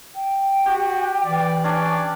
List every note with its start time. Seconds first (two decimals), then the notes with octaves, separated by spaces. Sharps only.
0.15 G5
0.66 F#4 G4
1.25 E3 D5
1.64 C#4 D4 D5